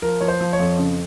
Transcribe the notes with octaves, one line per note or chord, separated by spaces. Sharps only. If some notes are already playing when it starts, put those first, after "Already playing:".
F3 A#4
F3 C#5
C5
F3
C#5
F2
C#3